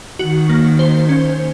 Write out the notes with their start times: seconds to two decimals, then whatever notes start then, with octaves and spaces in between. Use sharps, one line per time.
0.19 D#3 F#4
0.49 A#3
0.79 C5
1.09 C#4